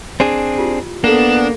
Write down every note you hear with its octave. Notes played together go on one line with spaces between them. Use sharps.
C4 D4 G#4
E4 F4 G4
A#3 B3 D4 A4 F#5